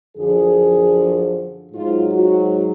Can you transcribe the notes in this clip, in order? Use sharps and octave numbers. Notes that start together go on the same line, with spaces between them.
F#2 D3 F3 G#4
G#2 F#3 F4
F#4